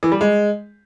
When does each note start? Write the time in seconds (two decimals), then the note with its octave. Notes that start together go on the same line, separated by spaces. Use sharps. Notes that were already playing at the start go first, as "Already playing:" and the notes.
0.03 E3
0.12 G3
0.21 G#3